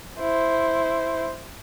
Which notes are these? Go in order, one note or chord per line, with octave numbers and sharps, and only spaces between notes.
E4 C5